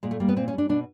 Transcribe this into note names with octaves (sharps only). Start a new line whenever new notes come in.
A#2 G#3
A3
G3 A#3
B3
A#2 C4
C#4
G3
D4
B2 D4